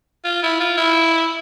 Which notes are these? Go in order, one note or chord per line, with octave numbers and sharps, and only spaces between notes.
F4
E4
F4
E4